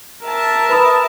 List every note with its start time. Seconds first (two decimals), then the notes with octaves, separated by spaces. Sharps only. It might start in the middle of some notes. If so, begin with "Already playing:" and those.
0.25 A#4 E5 A5
0.69 B4 B5 D#6